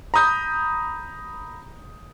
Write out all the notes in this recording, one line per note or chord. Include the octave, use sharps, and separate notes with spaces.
A#5 B5 D#6 G6